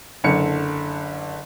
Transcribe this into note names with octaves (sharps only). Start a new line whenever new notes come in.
F#1 D3 C#7